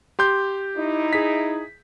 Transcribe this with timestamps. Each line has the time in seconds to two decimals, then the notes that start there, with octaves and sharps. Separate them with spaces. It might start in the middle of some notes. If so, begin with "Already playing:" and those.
0.19 G4 C6 G6
0.76 D#4 E4
1.13 G#4 B6